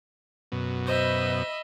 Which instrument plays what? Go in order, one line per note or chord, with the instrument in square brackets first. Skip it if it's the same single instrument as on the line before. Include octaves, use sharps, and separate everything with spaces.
[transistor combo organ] F#2 B2
[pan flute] C5 [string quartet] D#5 E5 B5